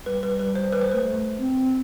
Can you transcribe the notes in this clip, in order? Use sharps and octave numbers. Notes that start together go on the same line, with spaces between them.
G3 B4
B4
G3 B4
C5
G3 B4
C5
A3 B4
C4